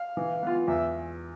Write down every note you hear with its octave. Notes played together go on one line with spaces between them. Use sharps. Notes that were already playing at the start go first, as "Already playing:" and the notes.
Already playing: F5
E3
B3 F4
E2 E5